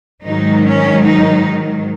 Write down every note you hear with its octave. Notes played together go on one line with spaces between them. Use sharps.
G#2 D#3 F#3 D#4
C#4
D#4